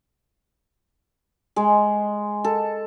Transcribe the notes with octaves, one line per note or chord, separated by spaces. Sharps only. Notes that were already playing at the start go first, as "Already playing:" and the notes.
G#3
A4